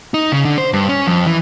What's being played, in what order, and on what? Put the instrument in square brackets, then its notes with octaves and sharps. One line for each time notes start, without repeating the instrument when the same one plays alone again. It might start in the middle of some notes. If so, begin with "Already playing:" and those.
[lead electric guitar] D#4
C#3
D3
C5
G2
C#4
F2
E3